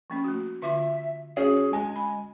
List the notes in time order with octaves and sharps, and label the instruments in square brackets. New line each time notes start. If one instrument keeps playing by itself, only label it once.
[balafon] F3 A#3 C#4
A3 F#4
[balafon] D3 F4 C6 [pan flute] E5
[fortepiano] C#4 [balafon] F#4 [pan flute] G#4
[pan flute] G#3 [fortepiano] G#5
[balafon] B5